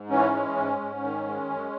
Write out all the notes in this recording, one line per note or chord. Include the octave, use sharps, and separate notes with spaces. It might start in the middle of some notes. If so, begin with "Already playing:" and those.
Already playing: G#2
E3 C#4
G#3
G#2
G#2
D#3
G#3
F#2